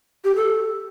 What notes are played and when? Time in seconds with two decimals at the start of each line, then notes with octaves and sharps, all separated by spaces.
0.25 G4
0.36 A4